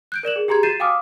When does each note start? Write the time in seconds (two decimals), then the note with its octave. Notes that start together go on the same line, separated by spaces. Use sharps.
0.12 F#6 G6 D7
0.23 A#4 D5 E7 F#7
0.36 G#4
0.48 G4 G#4 A#5 C6 G#6
0.63 F#4 G6 A6 C7 D#7 E7
0.80 F5 G5 G#5 D6 D#6 F6